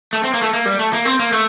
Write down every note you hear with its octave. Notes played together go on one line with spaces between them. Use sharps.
A3
C4
A#3
A3
A#3
G3
A3
A#3
C4
A#3
A3